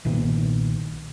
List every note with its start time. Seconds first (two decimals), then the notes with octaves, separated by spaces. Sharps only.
0.05 B1 A#2 D#3 B3